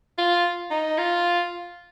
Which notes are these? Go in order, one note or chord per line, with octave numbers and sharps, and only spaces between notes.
F4
D#4
F4